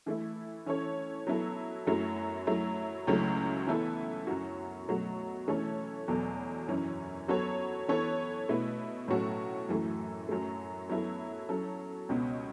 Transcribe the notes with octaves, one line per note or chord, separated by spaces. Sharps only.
E3 A3 E4
E3 C#4 A4 C#5
F#3 B3 E4 A4
F#2 F#3 A3 E4
F#3 A3 E4
C#2 C#3 F#3 A3 E4
E3 B3 E4 A4
F#2 F#3 C#4 F#4
B2 F#3 A3 F#4
E3 A3 C#4 A4 C#5
E2 B2 F#3 B3 A4
F#2 E3 C#4
F#3 B3 F#4 A4 C#5
E3 B3 A4 C#5
B2 A3 E4 B4
A2 F#3 C#4 F#4 A4
F#2 E3 A3
F#2 F#3 A3
F#3 B3 E4 A4
F#3 C#4 A4
C#2 B2 B3